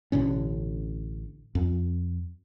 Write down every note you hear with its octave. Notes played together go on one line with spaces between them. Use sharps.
A1 B2 D3 C#4
F2